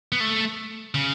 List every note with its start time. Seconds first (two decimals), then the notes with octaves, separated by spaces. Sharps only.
0.12 B3
0.20 A3
0.94 C#3